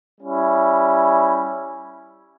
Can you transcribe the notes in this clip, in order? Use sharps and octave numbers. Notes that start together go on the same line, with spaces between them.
G3 C#4 E4